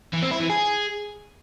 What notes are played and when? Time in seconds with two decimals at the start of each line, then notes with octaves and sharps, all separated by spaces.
0.13 E3
0.22 C4
0.31 E4
0.40 E3
0.49 G#4